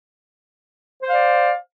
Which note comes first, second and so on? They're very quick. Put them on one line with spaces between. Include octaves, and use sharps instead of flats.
C5 F5 D5